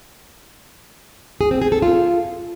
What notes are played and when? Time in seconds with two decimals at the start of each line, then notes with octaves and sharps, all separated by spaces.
1.41 G#4
1.51 C4
1.62 G#4
1.72 A4
1.82 F4